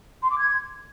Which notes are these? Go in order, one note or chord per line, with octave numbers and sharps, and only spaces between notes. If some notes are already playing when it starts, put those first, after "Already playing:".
C6
D6
G#6